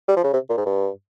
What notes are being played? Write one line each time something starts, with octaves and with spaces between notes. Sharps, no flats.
G3
F3
C#3
C3
A#2
G#2
G2